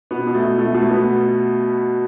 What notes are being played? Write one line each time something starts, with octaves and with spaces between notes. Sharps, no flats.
B2 B3
B2
A3
B2
B2 A3
B2 A3
B2 B3